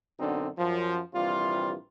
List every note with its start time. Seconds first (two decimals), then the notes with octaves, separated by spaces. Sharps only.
0.18 F#2 B2 D3 C4 D4 D#4
0.57 F#2 F3
1.14 A#1 C3 E3 G3 F4